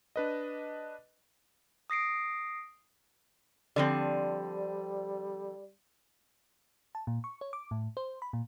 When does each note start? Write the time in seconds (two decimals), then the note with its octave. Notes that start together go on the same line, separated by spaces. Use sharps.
0.16 D4 B4 D#5
1.90 D#6 A#6 C7 D7
3.76 D3 F3 G3 C4 D5
6.95 A5
7.07 A#2
7.24 C#6
7.41 C#5
7.53 D6
7.71 A2
7.97 C5
8.22 B5
8.33 A#2